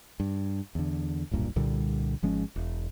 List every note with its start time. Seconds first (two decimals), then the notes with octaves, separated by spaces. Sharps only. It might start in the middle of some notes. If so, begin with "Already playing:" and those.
0.20 G2
0.75 E2 D3
1.31 D1 B1 G2 A#2
1.56 C2 A#2 D3 G3
2.22 G#1 F3 G#3 C#4
2.56 E1